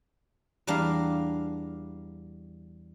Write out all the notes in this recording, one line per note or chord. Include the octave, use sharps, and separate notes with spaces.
E2 G3 A#3 D4 F5